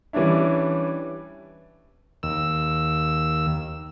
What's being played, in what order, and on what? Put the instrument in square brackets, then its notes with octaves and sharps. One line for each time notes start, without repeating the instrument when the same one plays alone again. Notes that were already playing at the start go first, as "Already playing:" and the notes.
[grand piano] E3 G3 C#4 D4 E4
[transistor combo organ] D#2 E6